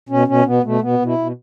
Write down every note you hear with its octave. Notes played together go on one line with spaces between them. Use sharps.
B2 C#4
B2 C#4
B2 B3
B2 A3
B2 B3
B2
E4
B2